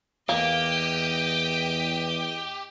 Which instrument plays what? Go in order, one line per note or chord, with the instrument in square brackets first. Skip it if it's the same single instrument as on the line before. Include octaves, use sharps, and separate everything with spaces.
[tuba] E2 [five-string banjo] A#3 [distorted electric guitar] G4 [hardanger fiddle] D#5 G5